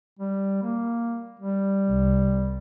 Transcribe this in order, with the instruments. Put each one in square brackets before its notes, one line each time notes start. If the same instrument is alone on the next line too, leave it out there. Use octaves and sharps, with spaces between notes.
[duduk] G3
A#3
G3
[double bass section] C2